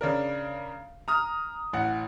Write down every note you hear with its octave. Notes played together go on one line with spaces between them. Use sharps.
C#3 D4 A#4
A#5 D#6 F6
A1 F#5